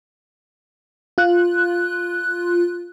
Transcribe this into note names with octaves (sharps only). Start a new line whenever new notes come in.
F4 F#6